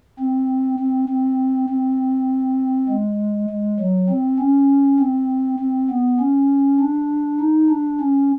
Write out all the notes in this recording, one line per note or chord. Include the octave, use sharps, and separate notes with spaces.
C4
C4
C4
C4
G#3
G#3
F#3
C4
C#4
C4
C4
B3
C#4
D4
D#4
D4
C#4